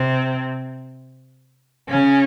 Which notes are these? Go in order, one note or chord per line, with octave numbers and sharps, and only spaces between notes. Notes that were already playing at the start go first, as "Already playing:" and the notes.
Already playing: C3 C4
C#3 C#4